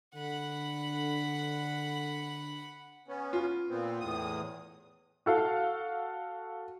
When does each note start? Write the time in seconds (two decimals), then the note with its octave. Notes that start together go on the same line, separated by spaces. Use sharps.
0.15 D3 F#5 B5
3.08 B3 C#4
3.33 F4
3.69 A#2 B3 C4
4.00 E2 A2 D#6
5.26 F#4 A4 F5